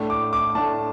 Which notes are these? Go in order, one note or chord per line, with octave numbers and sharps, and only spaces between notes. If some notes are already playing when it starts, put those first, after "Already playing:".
Already playing: A2 A3 D4
D6
D6
A2 A3 D4 A5